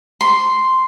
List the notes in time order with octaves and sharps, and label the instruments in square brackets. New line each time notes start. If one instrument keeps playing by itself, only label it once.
[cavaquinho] C6